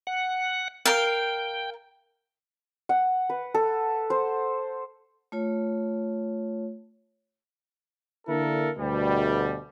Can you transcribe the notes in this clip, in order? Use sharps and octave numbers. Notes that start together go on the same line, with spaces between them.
F#5
A#4 F5 G5
F#5
B4
A4
C5
A3 F4 C#5
D3 A#3 D4 E4 A4 A#4
D2 B2 G3